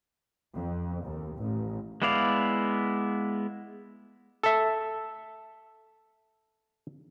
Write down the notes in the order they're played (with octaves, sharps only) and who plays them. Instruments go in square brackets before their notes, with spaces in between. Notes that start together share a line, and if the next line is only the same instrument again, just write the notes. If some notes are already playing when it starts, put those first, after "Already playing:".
[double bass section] F2
D#2
A1
[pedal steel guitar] G#3 B3 E4 D5 F5
[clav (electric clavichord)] A4 E5